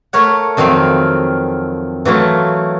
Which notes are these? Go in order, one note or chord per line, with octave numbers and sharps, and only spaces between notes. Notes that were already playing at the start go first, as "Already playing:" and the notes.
A3 A#4 C#5 F#5
F2 D#3 F#3 C4 F5
E3 F#3 A3 F4